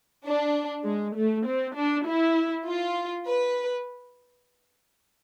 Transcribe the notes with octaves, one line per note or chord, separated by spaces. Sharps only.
D4
G#3
A3
C4
D4
E4
F4
B4